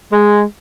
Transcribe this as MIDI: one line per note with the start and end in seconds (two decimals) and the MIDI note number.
0.11 0.42 56